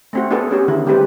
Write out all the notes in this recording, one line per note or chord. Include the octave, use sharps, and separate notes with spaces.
A3 C4 F#4
B3 D4 F#4 G#4 A4 B4
C#4 G4 G#4
D3 D#3 B3 E4
G3 G#3 C4 G4 B4